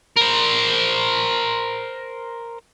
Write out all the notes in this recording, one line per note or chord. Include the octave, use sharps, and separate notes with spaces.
A#4 C5